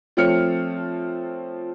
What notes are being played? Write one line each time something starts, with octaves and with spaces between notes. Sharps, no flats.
F3 A3 C4 C#5 F6 C#7